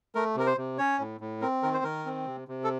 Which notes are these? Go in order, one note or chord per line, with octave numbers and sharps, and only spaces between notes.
A3 A#4
C3 A#4
C5
C3
C#4 C#5
A2
A2
C4 A#4
D#3 A#4
C5
D#3 A#4
C4
C3
C3
A4